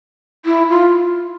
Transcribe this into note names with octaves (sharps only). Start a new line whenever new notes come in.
E4
F4